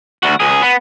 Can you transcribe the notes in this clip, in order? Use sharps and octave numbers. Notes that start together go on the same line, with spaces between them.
D2 F#4
C#2 G#4
B3